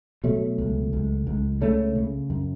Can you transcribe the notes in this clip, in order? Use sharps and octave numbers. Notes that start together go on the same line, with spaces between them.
B2 F#3 A3
C#2
C#2
C#2
C#3 A3 C#4
C#3
F#2